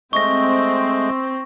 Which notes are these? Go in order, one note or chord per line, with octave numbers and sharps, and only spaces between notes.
G#3 A3 C4 D#5 C#6 A#6